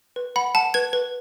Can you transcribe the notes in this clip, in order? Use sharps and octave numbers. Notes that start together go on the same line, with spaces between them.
B4
F#5 B5
F#5 A5
B4 G#6
B4